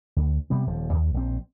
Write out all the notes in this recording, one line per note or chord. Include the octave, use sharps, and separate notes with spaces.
D2
C3 G3 B3
D#1 F3
D#2
A#1 C4